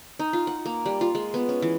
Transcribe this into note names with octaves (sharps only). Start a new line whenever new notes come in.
D#4
F4
F#5
A#3
G3
F4
G#3
B3
C#4
E3